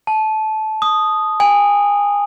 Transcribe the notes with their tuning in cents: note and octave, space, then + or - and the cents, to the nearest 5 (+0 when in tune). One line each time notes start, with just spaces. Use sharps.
A5 -20
D#6 -5
G#5 -30